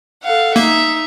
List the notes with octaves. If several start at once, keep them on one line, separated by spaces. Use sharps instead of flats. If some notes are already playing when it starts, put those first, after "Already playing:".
A4 F5 F#5
A#3 D#4 E5